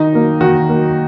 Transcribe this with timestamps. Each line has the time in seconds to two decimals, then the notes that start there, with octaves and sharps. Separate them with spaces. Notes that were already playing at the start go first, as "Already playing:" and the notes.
Already playing: D#3 D#4
0.12 F#3 A#3
0.41 D#3 F#4
0.69 F#3 A#3